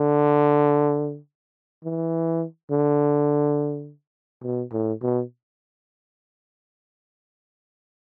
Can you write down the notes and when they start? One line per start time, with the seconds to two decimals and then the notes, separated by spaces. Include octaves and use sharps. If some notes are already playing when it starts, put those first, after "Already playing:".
Already playing: D3
1.84 E3
2.71 D3
4.43 B2
4.72 A2
5.02 B2